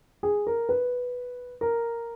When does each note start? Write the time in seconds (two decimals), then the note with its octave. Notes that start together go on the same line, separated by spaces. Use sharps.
0.23 G#4
0.47 A#4
0.69 B4
1.61 A#4